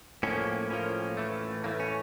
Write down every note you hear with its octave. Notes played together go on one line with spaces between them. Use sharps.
A2 F3 A#3 C#4
A2 F3 A#3 C#4
A2 E3 A3
A2 E3 A3 A#3
C#4